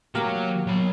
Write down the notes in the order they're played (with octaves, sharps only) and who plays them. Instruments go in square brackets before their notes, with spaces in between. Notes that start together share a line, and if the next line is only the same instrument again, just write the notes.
[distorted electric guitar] F#3 [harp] A#3 [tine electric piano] G4 A#4
[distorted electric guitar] F#3 B5